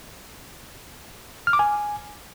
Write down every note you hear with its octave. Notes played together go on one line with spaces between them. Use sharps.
F6
D6
G#5